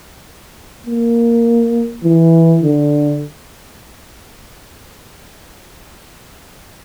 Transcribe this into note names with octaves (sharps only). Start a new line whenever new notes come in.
A#3
E3
D3